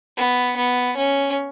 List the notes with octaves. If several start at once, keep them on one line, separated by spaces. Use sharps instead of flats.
B3
B3
C#4